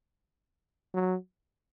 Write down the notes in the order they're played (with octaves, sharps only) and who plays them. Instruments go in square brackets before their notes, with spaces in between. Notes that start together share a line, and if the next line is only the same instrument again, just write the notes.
[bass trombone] F#3